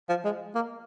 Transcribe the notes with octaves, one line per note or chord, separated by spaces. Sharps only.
F3
G#3
A#3